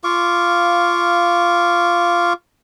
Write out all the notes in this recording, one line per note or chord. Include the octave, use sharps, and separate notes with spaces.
F4 F5 C#6 D6